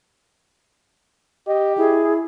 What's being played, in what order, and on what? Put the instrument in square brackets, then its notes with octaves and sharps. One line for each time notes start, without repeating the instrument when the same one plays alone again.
[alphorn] G4 [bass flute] D#5
[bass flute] E4 [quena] G#4